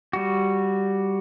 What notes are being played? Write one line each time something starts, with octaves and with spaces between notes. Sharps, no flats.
G3 F#4